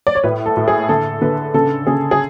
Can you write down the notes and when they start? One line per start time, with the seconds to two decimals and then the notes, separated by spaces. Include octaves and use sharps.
0.07 D5
0.15 C#5
0.24 A2 B4
0.46 A4
0.57 A2
0.68 G#4
0.89 D3 A4
1.21 D3 B4
1.54 C#3 A4
1.87 C#3 G#4
2.11 G#4